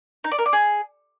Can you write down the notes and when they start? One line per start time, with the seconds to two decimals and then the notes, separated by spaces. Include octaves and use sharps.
0.24 D#4
0.31 D5
0.39 A#4
0.46 D5
0.53 G#4